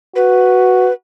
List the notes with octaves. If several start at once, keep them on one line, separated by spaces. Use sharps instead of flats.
F#4 B4